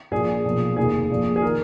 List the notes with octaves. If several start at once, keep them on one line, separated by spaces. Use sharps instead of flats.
A#1 A#2 F3 G#4
B1 A#2 F3
F1 D#2 D#3 G#4
A#1 A#2 F3
G#4
D#3 A#4